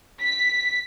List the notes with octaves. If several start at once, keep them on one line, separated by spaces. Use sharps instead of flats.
B6